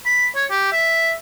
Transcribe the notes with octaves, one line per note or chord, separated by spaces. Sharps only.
B5
C#5
G4
E5